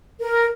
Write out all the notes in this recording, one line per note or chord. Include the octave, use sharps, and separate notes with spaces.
A#4